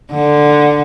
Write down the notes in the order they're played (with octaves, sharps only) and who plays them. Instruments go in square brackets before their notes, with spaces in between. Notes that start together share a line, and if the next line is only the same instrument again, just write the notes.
[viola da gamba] D3